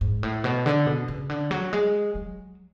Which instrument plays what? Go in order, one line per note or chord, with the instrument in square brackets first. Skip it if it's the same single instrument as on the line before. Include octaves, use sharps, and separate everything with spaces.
[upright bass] G#2
A2
B2
D3
B2
C#3
D3
F#3
G#3
F#3